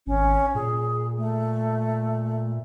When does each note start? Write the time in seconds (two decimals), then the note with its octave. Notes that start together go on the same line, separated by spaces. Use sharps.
0.07 G#1 C#4
0.55 A#2 G#4
1.17 A3